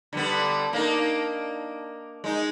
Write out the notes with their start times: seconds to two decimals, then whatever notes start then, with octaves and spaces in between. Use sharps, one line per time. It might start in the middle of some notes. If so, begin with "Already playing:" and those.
0.13 D3 G3 B3
0.73 A#3 D4 D#4
2.24 G#3 D#4